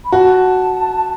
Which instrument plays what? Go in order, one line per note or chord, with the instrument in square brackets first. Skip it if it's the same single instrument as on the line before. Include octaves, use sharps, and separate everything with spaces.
[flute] B5
[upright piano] F#4 [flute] A5